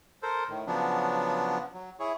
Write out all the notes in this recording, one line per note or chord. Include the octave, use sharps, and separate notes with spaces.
A4 A#4 C5
A2 D#3
C#3 F3 F#3 B3 D4
F#3
E4 G#4 C#5